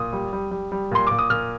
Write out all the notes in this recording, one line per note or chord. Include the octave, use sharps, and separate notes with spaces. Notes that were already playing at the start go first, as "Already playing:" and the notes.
Already playing: A#2 D#6
G3
G3
G3
G3
A#2 C6
A#2 D6
D#6
A#2 F6